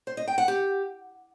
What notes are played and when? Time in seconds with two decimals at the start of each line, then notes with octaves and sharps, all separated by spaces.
0.07 C5
0.17 D#5
0.27 G5
0.38 F#5
0.48 G4